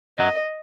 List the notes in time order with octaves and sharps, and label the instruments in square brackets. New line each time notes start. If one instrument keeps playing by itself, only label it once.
[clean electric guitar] F#2 F#3 [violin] D#5